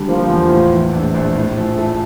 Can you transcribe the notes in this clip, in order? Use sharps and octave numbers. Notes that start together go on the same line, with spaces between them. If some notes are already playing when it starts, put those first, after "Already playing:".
Already playing: D3 G3
F3 A#3
E2
A2
E3
A#1
A#1
A2
F3
A3